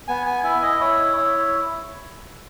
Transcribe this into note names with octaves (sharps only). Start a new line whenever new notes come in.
B3 G#5
G#5
E4 G#5
D#5
E4 C#5
E4 C#5